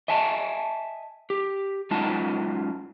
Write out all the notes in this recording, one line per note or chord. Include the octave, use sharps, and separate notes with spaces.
D#5 E5 G#5 A5
G4
F#2 G#3 D#4 F4 A5